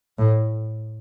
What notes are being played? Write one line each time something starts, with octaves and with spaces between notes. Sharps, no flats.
A2